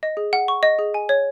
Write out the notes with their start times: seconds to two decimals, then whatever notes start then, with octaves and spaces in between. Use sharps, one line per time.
0.03 D#5
0.17 G#4
0.33 F#5
0.48 C#6
0.63 D#5
0.79 G#4
0.94 G#5
1.09 C#5